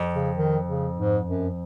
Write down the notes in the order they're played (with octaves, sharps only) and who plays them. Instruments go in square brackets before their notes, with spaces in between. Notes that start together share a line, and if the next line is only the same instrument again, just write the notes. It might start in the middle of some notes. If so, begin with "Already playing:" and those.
Already playing: [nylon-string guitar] F2
[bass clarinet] C#3
D#3
C#3
G#2
F#2